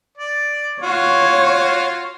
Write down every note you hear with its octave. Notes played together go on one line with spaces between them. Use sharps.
D5
F4 F#4 C#5